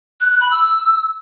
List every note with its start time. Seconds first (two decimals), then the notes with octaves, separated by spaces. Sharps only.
0.21 F#6
0.31 F#6
0.41 B5
0.51 E6